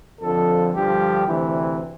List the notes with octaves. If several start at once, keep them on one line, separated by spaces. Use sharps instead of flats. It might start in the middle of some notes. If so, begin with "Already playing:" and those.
F2 D3 F3 A4
G2 D3 F3 G4
D2 C3 E3